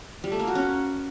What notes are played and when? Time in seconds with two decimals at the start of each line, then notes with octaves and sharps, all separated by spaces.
0.24 G3
0.32 A3
0.40 A#3
0.47 F#4
0.55 C#4